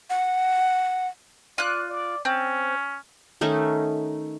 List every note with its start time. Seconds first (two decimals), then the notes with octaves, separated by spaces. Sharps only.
0.10 F#5
1.58 F4 D5 F#6
1.89 D5
2.25 C4 C#4
3.41 D#3 A3 C#4 D#4